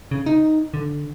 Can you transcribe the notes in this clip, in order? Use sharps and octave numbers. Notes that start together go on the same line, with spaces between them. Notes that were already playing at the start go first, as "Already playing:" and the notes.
C#3
D#4
D3